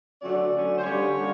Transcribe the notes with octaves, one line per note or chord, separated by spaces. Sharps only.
D3 F#3 A3 C#4 D5
D3 F#3 A3 C#4
C5
D3 G3 A#3 C#4 C#5
D3 G3 A#3